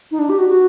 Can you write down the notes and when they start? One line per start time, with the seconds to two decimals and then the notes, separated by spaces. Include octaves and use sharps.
0.12 D#4
0.19 D4
0.29 G4
0.38 F#4
0.49 F#4